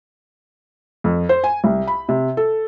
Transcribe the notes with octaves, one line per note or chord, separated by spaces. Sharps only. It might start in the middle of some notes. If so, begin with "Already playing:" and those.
F2
C5
G#5
C2
B5
C3
A4